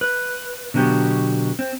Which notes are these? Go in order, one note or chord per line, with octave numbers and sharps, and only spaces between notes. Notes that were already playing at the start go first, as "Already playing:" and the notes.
B4
B2 D3 F#3 B3 G4
C4